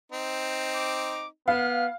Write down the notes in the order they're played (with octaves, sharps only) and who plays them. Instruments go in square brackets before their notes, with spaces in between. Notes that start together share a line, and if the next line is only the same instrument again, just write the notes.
[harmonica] C4 D#4
[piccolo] D6
[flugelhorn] B3 [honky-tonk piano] F5 [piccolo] F6